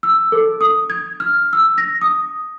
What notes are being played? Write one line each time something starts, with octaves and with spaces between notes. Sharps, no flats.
E6
A4
D#6
G#6
F6
E6
A#6
D#6